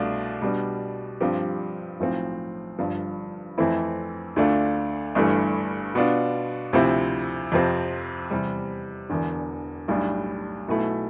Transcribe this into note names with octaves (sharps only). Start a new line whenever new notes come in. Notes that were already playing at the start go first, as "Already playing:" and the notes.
Already playing: C2 B2 A3 D4 F4
B2 G3 D4
G2 F3 C4 G4
B1 A2 F3 C4
G1 G2 F3
F2 E3 A3 C4 E4
D2 D3 A3 D4 F4
G1 G2 E3 A3
B2 B3 D4 F4
D2 C3 F3 C4 E4
F2 C3 F3 C4
E2 C3 G3
E1 E2 D3
B1 A2 G3 D4
B1 B2 A3 E4